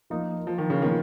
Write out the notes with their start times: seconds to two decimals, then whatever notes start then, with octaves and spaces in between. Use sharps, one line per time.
0.10 F3 A#3 D#4
0.47 F3
0.58 D#3
0.70 C#3
0.82 A#2 D#3 F3 B3 D#4